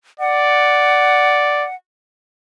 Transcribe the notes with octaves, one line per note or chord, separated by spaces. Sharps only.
D5 F#5